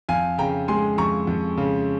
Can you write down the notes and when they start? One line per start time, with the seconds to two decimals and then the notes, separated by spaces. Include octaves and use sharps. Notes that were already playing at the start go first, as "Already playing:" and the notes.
0.09 F2 F5 G#5
0.38 C#3 G5 A#5
0.68 G#3 G#5 C6
0.98 F2 A#5 C#6
1.27 F2
1.58 C#3